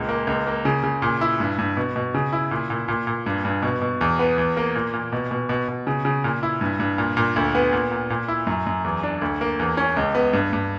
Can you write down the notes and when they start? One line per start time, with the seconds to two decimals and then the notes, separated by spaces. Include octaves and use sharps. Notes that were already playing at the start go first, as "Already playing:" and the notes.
Already playing: C#2 A#2
0.09 A#3
0.27 C#2
0.47 A#3
0.65 C#3
0.83 C#3
1.02 A#2
1.21 E4
1.40 G2
1.58 G2
1.77 B2
1.96 B2
2.14 C#3
2.33 E4
2.51 A#2
2.70 A#2
2.88 A#2
3.07 A#2
3.26 G2
3.45 G2
3.62 B2
3.81 B2
4.01 E2
4.19 B3
4.38 E2
4.57 A#3
4.75 A#2
4.93 A#2
5.12 B2
5.31 B2
5.49 B2
5.68 B2
5.87 C#3
6.05 C#3
6.24 A#2
6.43 E4
6.61 G2
6.80 G2
6.98 A#2
7.17 A#2
7.36 D2
7.55 B3
7.73 A#2
7.92 A#2
8.10 A#2
8.28 E4
8.47 F#2
8.67 F#2
8.84 E2
9.03 D4
9.21 D2
9.41 A#3
9.59 E2
9.77 C#4
9.97 C#2
10.15 B3
10.33 G2
10.53 G2